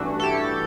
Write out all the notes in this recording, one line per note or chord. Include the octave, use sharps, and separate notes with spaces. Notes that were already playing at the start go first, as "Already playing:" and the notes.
Already playing: A1 G2 E3 A3 D4 F#4
A4
E4 G4